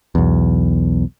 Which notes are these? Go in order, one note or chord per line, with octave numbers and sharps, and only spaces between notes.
B1 E2